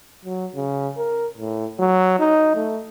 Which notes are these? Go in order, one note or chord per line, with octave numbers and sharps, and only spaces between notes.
F#3
C#3
A#4
A2
F#3
D#4
A3